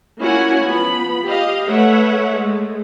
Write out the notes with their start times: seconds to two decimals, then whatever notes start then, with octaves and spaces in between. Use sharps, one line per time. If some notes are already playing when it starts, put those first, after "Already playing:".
0.20 A#3 C#4 E4 F#4 F#5 G#5
0.67 F3 B3 B5
1.24 G4 D#5 F5
1.68 A3 B4 C#5 E5 F#5
2.33 G#3 A3